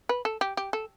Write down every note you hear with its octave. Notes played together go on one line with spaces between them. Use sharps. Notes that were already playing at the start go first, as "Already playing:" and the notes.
B4
A4
G4
G4
A4